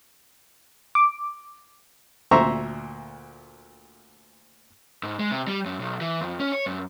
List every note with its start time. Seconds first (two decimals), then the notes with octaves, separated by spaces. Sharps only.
0.95 D6
2.31 D2 A#2 C5 E5 A#5 C#6
5.03 G#2
5.19 G#3
5.31 C3
5.47 G3
5.65 F#2
5.80 B1
6.01 E3
6.21 F2
6.40 C#4
6.52 C#5
6.66 F#2